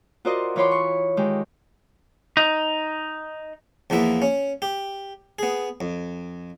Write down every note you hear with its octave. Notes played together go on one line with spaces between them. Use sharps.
F4 F#4 A#4 C5 D5 D#5
E3 F4 C#5 B5 C6 D6
C#6
D#3 G#3 G4
D#4
E2 F3 A#3 B3 E5
C#4
G4
B3 G#4
F2